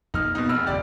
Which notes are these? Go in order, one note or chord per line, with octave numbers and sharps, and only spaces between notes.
E2 A#3 D#4 F6
B2 D#4
F1 E6 F6
C#2 F#2 A2 G4 D5